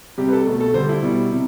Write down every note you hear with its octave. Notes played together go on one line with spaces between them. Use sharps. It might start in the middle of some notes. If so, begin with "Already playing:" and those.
C3 G3 G4
B4
A4
B2 A3
A4
D3 G3 C5
E4
B2 G3
C3